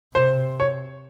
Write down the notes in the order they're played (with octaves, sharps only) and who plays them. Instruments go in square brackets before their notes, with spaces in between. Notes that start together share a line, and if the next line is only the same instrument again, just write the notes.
[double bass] C3 [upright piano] C5
[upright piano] C#5